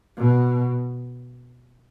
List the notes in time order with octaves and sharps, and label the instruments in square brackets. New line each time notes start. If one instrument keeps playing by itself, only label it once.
[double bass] B2